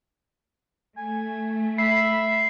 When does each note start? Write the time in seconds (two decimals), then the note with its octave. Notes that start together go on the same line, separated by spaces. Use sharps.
0.97 A3 G#5
1.78 E5 B5 C7